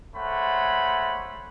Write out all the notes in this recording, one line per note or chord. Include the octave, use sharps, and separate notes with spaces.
G#3 A3 C5 C#5 F#5 B5